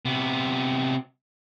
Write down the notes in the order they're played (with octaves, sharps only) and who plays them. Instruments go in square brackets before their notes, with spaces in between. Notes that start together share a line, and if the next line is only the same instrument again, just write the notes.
[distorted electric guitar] C3 B3